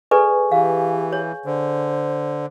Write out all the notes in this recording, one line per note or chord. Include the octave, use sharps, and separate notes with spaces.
G#4 A4 B4 D5 G#5 C#6
E3 G4 F5
C#5
D3 C5